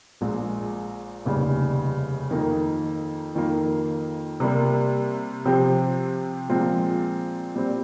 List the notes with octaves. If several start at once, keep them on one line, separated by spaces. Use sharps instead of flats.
A#1 A#2 G#3
F1 D#2 C#3 G3
F2 D#3 A#3 D#4
F2 D#3 A#3 F4
C3 G3 A#3
C3 F3 C4 G4 C5
A#2 F3 G#3 C4 F4
A#2 G3 C4